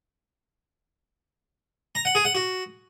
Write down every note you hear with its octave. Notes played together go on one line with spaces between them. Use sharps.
A#5
F#5
G#4
F#5
F#4